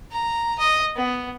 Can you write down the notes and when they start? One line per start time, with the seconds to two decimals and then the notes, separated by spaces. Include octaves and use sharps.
0.11 A#5
0.59 D#5
0.96 B3